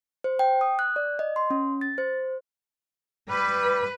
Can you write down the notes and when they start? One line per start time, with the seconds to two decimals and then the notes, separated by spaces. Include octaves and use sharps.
0.24 C5
0.39 G5
0.61 D#6
0.79 F#6
0.96 D5
1.19 D#5
1.36 C6
1.50 C#4
1.81 A6
1.98 C5
3.30 G3 B4